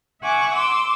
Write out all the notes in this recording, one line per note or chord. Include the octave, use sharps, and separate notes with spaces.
E5 F#5 G#5 C#6 D6
C6 D6 E6